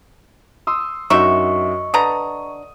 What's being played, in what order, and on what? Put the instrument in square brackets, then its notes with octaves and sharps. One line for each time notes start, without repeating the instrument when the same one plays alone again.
[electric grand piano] C6 D#6 E6
[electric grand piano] F#2 F#4 [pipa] D4 D#4 E5 [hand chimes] D#5 C#6
[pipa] D3 B4 A#5 [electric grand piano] D#6